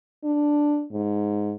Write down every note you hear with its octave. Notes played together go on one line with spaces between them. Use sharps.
D4
G#2